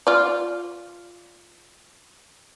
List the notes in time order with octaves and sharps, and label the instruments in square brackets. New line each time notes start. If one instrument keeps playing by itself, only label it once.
[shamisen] F4 D5